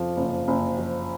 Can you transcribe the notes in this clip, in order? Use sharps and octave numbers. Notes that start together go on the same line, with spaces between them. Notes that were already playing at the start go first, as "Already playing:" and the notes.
Already playing: F2 F3
F#1
F#1
F3